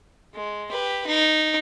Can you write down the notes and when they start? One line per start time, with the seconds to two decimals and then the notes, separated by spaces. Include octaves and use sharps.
0.34 G#3
0.71 G4 B4
1.07 D#4